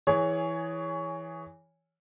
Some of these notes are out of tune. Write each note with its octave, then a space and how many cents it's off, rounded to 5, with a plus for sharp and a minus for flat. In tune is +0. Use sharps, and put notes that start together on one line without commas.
E3 +0 G#4 +0 C#5 +15